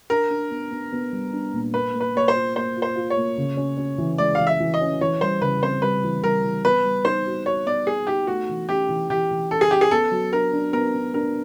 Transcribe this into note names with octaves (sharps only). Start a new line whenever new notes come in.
D4 A#4
D4
B3
B3
B3
G3
D4
A#2
A#3 B4
A#3
B4
A#3 C#5
C5
F4
A#3 C5
F4
C5
F4
C#5
A#3
C#3
C#4
C#4
E3
G#3 D5
E3 F5
E5
E3
D#5
C#4
E3 C#5
G3 C5
C#3 B4
C4 C5
G3 B4
E3
G3 A#4
E3
B3 B4
G3
D#4 C5
F#4
F#4 C#5
B3 D5
B3 G#4
D#4 G4
A3 F#4
E3
C#4 G4
E3
E3 G4
E3
C#4 A4
G#4
C#4 G4
G#4
B3 A4
F#3
D4 A#4
D4
B3 A#4
D4
D4 A#4